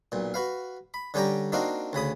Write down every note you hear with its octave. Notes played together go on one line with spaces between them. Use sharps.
B1 A#2
F#4 B4 F5
B5
D3 G3 C#4 G4 G5 A#5
A#3 C4 D4 D#4 F#4 F5
D2 C#3 B5 D#6